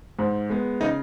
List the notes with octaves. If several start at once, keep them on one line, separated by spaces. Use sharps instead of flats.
G#2
G#3 B3
C#3 D#4 D#5